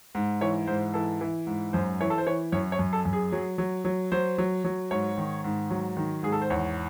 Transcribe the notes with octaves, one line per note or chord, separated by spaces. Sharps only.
G#2
E3 C#5
G#2 C5
E3 A4
E3
G#2
F#2 C5
E3 C#5
A4
C5
E3 C#5
F#2 C#5
C#5
F#2
A4
F#2
G#4
F#3
F#3
F#3
F#3 C5
F#3
F#3
G#2 C#5
D#3
G#2
F#3
D#3
G#2 G#4
A4
C5
E2 C#5